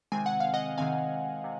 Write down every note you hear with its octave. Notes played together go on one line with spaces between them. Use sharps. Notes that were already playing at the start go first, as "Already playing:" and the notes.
C3 D#3 G#3 C4 G#5
F#5
F5
D#5 F#5
C3 D#3 G#3 C4 F5 G#5
C3